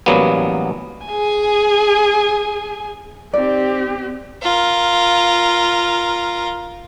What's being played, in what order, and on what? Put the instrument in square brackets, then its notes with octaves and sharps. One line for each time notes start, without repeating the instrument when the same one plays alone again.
[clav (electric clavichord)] A1 F#3 G3 A#3 B3
[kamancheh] G#4 G#5
[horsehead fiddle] C4 G4 [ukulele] D#4 D5
[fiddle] F4 A#4